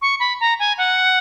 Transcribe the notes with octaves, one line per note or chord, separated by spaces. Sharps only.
C#6
B5
A#5
G#5
F#5